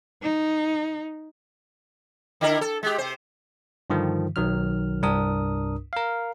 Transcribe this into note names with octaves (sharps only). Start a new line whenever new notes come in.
D#4
D3 E4 A#4
A4
G#3 G4
C3 C5
G2 D3 D#3 F3
B1 D#3 F#3 F6
C2 G2 D4 A#4 D#6
A#4 F5